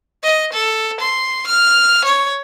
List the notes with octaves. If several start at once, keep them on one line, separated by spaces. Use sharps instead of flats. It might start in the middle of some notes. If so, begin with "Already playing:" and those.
D#5
A4
C6
F6
C#5